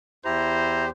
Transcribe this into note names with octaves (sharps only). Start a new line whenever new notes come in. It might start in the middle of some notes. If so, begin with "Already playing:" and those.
E2 E4 G4 C5 A#5